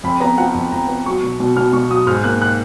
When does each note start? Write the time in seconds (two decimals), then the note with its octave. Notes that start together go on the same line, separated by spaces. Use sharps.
0.04 F2 B5
0.20 B3 A#5
0.38 F3 F#5
0.54 F2
0.72 F2 A#5
0.89 B3
1.06 F#3 C#6
1.23 B2
1.40 B2
1.57 B2 F6
1.73 B2 C#6
1.90 F#3 D#6
2.07 G#2 F6
2.24 A#3 F#6
2.42 F#6